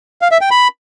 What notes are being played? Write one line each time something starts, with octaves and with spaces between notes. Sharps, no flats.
F5
E5
G5
B5